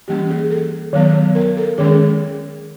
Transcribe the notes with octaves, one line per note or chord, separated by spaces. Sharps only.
E3 G3 A#3 C#4 G4
G#4
A4
D#3 F#3 B3
A#4
A4
D#3 G#3 C#4 G#4